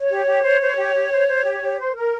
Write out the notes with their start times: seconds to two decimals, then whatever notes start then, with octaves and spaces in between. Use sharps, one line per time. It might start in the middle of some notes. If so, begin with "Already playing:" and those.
Already playing: C#5
0.10 G4
0.27 G4
0.44 C5
0.61 C5
0.77 G4
0.94 G4
1.11 C5
1.27 C5
1.45 G4
1.61 G4
1.77 C5
1.94 A#4